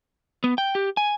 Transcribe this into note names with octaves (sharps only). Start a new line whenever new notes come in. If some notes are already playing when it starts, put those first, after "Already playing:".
B3
G5
G4
G#5